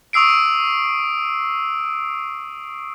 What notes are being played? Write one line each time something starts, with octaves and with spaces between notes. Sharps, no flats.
C#6 D#6 E6 C7 D7